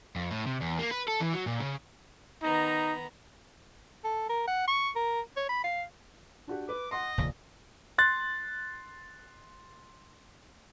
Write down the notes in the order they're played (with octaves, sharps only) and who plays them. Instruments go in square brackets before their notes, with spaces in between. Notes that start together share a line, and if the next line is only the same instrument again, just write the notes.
[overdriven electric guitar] F2
A2
C3
E2
A#3
B4
A4
E3
F#3
A#2
C#3
[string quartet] D#3 B3 A#5 [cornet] D#4
[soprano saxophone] A4
A#4
F#5
C#6
A#4
C#5
B5
F5
[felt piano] D4 F#4 G4
[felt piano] B4 [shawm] D6
[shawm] D#5 [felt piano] F#5 C6
[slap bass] F1 D#2 C#3 [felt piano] A#2
[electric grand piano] C6 F#6 A6